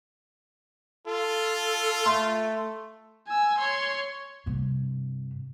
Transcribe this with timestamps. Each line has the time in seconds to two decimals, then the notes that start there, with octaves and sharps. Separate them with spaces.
1.07 F4 A4
2.06 A3 C6
3.28 G#5 E6
3.58 C#5 C6
4.46 G2 C3